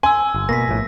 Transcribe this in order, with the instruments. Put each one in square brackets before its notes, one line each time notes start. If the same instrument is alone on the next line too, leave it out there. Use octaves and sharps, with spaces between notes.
[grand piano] G#5 [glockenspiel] C6 E6
[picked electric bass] G1
[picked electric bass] B2 A#3 [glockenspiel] A#6 B6
[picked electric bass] A#1 A2